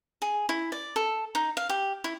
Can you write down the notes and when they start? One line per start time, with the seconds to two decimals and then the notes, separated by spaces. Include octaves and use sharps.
0.22 G#4
0.49 E4
0.72 D5
0.96 A4
1.35 D#4
1.57 F5
1.69 G4
2.04 E4